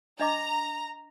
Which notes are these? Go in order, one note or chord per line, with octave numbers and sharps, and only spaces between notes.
D4 D#5 A#5 D6